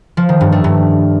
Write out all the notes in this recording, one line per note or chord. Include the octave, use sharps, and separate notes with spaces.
F3
D#3
G2
A3
G2